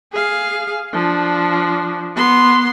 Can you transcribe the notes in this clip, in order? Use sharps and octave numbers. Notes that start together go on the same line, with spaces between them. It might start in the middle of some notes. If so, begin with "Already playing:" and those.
G#4 F5
F3 D4
B3 C6